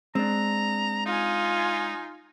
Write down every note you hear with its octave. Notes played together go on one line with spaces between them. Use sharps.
G#3 C4 D4 A#5
D#4 F4 G#5